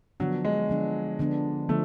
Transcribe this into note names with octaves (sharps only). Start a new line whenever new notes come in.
D3 F3 F#3 B3 D4
G#3
D3 F3 B3 D4
D3 F3 B3 D4
D3 F3 A3